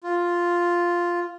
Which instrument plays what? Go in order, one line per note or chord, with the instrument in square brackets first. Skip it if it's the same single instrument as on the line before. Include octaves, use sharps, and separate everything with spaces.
[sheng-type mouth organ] F4